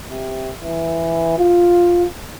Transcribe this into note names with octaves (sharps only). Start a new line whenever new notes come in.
C3
E3
F4